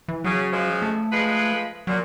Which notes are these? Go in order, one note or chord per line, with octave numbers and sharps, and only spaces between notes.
E3
C#3 F#3
C#3 F3 G#3
A3
F3 G#3 B4
A#2 F#3